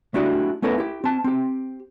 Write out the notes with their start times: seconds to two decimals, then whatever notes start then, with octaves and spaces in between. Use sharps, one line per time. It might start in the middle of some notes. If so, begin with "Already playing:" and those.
0.14 A3 D4 E4 F#4 G4
0.62 A3 B3 C#4 E4 A4 A#4
0.78 E4 G4
1.04 C4 A5
1.24 C4 G4